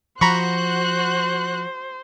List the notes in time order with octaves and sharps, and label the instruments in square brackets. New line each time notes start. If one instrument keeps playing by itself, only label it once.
[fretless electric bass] F3 [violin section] F#4 F#6 [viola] C5 [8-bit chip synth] A#5 B5 C#6